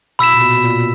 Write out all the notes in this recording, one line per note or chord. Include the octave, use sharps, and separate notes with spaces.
B2 B5 E6 B6 E7
A#2
B2
B2
A#2